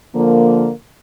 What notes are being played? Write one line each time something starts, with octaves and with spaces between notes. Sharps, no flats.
D3 F3 A#3